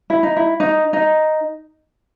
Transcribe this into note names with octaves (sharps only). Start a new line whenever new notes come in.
E4
D#4
E4
D#4
D#4